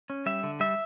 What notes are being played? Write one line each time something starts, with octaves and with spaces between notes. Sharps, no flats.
C#4
G3 E5
D3
G3 E5